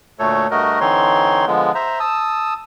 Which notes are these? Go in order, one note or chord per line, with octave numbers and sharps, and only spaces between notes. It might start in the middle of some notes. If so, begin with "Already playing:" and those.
D2 A#2 A3 A4 C#5
G2 A3 F#4 A#4 D#5
D3 E3 C4 D#4 C#5 C6
D3 F3 G#3 B3
C5 E5 A#5
A5 D#6 E6